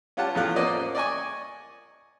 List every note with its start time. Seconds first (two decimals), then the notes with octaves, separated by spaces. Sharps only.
0.17 C#4 F4 G4 F#5 A5
0.35 E2 A2 F3 A3 F4 F#6
0.56 A#3 C#4 C5 D5 D#5 F#5
0.95 D5 D#5 G#5 C#6